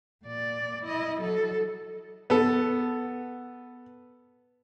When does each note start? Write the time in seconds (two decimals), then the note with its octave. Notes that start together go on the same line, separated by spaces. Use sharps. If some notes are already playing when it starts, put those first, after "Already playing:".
0.24 A#2 D5
0.83 E4 D#5
1.21 F#3 A4
2.30 B3 A4